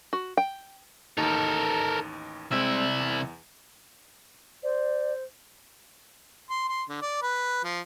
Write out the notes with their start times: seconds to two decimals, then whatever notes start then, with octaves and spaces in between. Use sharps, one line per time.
0.13 F#4
0.37 G5
1.18 A1 D#2 D#4 A4 A#4
2.52 C2 G#3 C4 E4 E6
3.00 E2
4.63 C5 D5
6.50 C6
6.69 C6
6.89 D3
7.02 D5
7.22 B4
7.64 F3